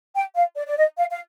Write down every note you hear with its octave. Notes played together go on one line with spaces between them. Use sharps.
G5
F5
D5
D5
D#5
F5
F5